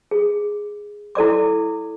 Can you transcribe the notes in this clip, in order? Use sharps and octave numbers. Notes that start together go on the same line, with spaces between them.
G#4
E4 A4 D5 D6